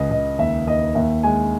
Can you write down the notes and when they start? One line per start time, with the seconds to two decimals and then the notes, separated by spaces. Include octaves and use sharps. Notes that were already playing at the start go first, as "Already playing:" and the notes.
Already playing: C#2 D#5
0.10 C#2 D#5
0.38 D#2 E5
0.67 D#2 D#5
0.95 D#2 E5
1.23 G#3 G#5